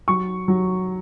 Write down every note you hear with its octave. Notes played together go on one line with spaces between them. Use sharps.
F#3 C#6
F#3